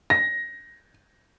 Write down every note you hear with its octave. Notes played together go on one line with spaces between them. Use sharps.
A#6